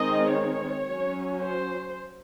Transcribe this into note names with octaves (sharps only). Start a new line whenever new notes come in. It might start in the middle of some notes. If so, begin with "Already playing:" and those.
Already playing: D#3 G#3 C4 D#5
C#5
F#3 C#4
C5